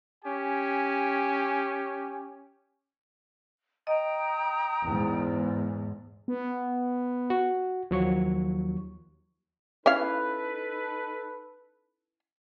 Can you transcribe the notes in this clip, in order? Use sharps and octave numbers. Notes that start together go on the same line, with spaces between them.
C#4 G4 G#5
D#5 G5 A#5 D#6
E2 G#2
B3
F#4
D#2 F3 F#3 C#6
C#4 D#4 E4 A4 B4 F5